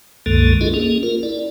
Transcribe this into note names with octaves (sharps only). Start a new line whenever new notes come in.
C2 F#2 D3 G#3 A#3 A4
D4 E4 F4 G#4 A4 D#5
A#3 C#4 G#4
F4 A#4
E4 D5